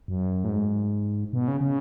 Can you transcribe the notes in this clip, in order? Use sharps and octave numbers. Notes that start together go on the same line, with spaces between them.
F#2
A2
G#2
B2
C#3
C#3